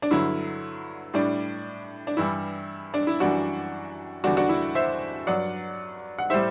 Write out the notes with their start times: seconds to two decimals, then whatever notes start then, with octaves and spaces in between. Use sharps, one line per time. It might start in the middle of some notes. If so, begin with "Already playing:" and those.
0.02 D4
0.10 G2 D3 F#3 E4
1.14 A2 G3 D4
2.07 D4
2.17 G2 E3 G3 E4
2.94 D4
3.07 E4
3.20 F#2 E3 G3 D4 F#4
4.24 E2 D3 G3 D4 F#4
4.37 D4 F#4
4.49 E4
4.75 C5 E5
5.27 G2 F#3 D5 F#5
6.18 F#5
6.30 A2 G3 C5 E5